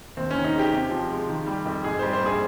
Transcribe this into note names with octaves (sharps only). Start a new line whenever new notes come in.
D#2 C4
C#4
D#3
D#4
G#3 G4
C3
F3
G#3
D#3
G3
F2
G#2 G#4
G3 C5
C5
A#1 G#4